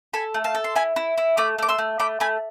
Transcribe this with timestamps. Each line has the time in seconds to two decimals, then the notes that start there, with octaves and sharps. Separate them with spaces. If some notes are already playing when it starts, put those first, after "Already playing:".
0.14 A4 G#5 B5
0.34 A3
0.44 F5 A5
0.55 A4
0.64 C6
0.75 E4 G#5 B5
0.96 E4
1.18 E4
1.37 A3 B5 D6
1.58 A3 D6
1.68 C6 E6
1.79 A3
1.99 A3 B5 D6
2.20 A3 G#5 B5